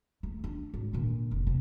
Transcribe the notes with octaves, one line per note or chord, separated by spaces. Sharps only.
A3
D4
G#1
A#2 D3
F1
C3